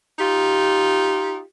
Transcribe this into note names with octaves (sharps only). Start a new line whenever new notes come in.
D#4 F4 G4